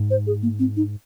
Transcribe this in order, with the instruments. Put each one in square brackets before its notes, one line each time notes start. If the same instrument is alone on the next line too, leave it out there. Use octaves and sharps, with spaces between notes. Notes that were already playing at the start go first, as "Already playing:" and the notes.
Already playing: [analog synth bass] G#2
[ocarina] C5
G#4
A#3
C4
D#4